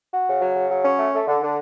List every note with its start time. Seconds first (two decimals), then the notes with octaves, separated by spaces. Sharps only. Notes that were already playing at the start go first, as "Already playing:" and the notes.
0.12 F#4
0.27 C#3
0.41 F#3
0.55 C#3
0.70 F#3
0.84 C#4
0.99 A3
1.13 A3
1.27 D3
1.42 D3